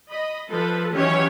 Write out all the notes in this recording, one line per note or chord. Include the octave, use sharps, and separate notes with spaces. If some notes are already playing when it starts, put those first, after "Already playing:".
D#5 B5
F3 A4 B4
D#3 E3 F#3 C#4 G4 C#5